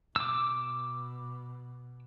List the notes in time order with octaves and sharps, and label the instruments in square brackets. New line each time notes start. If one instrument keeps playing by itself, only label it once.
[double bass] B2 [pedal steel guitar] D6 E6